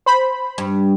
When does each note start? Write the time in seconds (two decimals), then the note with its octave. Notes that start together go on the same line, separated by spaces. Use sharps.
0.06 C5 B5
0.58 G2